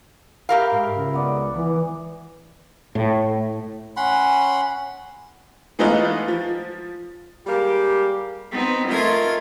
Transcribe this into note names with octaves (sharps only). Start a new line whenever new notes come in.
G4 A#4 E5 F5 B5
G#2 E5
C#2
B3 D5 F#5
E3 B4
A2
C#4 F#5 B5 C6
E3 G#3 A3 B3 D#4 F4
F3
G3 G#3 A#3 G4
B3 C4 D#4
A3 F4 A#4 D#5 G#6